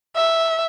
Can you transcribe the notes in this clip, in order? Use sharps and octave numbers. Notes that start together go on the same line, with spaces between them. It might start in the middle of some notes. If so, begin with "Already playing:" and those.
E5